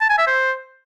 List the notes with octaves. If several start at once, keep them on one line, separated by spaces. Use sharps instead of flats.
A5
G#5
E5
C5